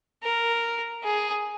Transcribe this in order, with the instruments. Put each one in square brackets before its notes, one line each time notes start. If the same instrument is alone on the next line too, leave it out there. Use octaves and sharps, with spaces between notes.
[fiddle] A#4
G#4